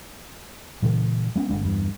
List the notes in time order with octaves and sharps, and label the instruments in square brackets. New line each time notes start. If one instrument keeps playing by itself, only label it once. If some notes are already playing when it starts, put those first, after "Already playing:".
[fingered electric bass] A#2 C#3 E3 G#3
G#3 B3 C#4
G1 G#2 G#3 D4
E2 G2